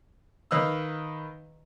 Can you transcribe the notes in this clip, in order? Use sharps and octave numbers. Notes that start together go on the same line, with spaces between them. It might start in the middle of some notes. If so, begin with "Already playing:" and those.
D#3 B4 D#5 F5 E6